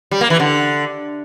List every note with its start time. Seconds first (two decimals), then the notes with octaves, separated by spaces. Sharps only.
0.11 G3
0.21 A#3
0.30 E3
0.40 D3